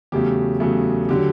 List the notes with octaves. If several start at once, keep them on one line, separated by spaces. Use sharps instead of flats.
E2 C#3 F#3 A3 G4
E2 C#3 F#3 A3
D3 F#3 G4